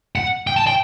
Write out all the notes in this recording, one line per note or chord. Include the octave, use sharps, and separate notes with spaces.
F#5
G5
A5
G5